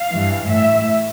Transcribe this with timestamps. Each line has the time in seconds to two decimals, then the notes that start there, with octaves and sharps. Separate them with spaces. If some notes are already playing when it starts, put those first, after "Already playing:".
Already playing: F5
0.13 G2 E3
0.50 A2 E5